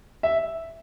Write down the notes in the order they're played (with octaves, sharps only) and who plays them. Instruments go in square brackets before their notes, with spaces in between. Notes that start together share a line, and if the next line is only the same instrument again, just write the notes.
[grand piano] E5